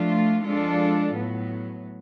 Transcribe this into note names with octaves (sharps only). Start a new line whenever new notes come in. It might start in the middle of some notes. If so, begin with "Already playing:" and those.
Already playing: F3 A3 D4 F4
F3 G#3 D4 F4 A4
A2 F#3 B3